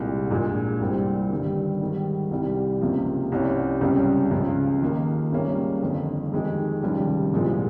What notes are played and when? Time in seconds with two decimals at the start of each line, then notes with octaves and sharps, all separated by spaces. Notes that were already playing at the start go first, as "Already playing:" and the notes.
Already playing: C2 A#2 G#3
0.30 A#1 A#2 G#3
0.80 C2 A#2 G3 C4
1.30 G1 G2 D#3 G3
1.80 G#2 D#3 G3
2.31 C2 C3 G3
2.81 C#2 C3 F3 A#3
3.32 C2 C3 G3 C#4
3.81 C#2 C3 G3 C#4
4.31 C#2 C#3 F3
4.82 D#2 D#3 A#3 D#4
5.32 C#2 C#3 G3 A#3 C#4
5.82 G1 F2 D#3
6.32 F2 D#3 G#3 D#4 G4
6.83 F1 D#2 C#3 G3
7.33 C2 A#2 F3 G#3